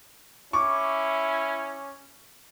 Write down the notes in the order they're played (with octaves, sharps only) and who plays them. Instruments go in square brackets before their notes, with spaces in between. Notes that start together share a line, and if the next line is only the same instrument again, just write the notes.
[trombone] C#4 [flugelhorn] E4 [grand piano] C#6 D6